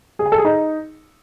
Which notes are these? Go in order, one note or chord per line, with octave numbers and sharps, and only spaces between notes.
G#4
G#5
A4
G#4
D#4